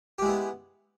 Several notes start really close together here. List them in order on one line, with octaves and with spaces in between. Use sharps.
G4 G#3 E4 B3